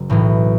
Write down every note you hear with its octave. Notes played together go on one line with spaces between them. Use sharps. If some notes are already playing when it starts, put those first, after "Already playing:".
Already playing: F#1
B1 A2 E3